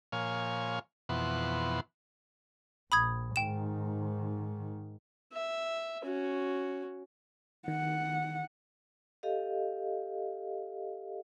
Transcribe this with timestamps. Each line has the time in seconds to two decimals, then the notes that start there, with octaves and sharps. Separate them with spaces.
0.12 A#2 F3 C#5 F5 G#5
1.09 F2 B2 E3 F#5 C6
2.92 A#1 B5 D#6 G#6
3.36 G#2 D#3 G5 E7
5.33 E5
6.04 C#4 F#4
7.68 D#3 F#5
9.23 G4 A4 D#5 F5